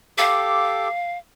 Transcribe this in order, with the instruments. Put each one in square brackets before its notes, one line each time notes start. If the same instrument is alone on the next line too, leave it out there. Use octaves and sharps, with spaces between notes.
[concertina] G4 A4 D6 [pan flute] F5